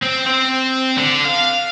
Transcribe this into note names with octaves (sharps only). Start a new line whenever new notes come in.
C4
C4
D3
F5